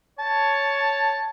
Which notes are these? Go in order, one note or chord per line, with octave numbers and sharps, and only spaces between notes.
C#5 A5